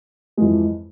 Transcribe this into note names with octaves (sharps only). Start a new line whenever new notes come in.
F2 E3 G#3